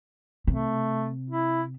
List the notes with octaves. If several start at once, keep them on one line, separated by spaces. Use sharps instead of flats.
C3 A3
E4